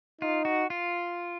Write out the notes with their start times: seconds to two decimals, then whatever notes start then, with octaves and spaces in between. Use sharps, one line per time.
0.21 D#4 F4
0.45 F#4
0.70 F4